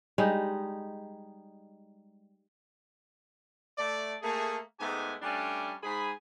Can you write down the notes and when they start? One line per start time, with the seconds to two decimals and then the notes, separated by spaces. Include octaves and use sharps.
0.18 G3 G#3 D#4
3.78 A3 D5
4.22 A3 A#3 G#4
4.80 G#2 G#3 A3 B3 G4 G#5
5.22 G3 A3 C#4 D4
5.83 G#2 G#4 B5